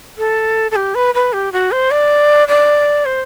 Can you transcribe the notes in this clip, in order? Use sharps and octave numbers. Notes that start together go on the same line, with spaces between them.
A4
A4
G4
B4
B4
G4
F#4
C5
D5
D5
C5